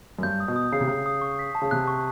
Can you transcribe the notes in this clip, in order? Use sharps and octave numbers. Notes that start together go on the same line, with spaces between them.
F#2
G2 G6
D#6
B2
D#6
C#3 C7
C3
C#3 G6
D#6
C#6
B6
A5
C#3
C3 F#6
C#6